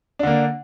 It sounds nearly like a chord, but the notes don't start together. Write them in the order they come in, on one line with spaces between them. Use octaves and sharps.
D4 D3 A#3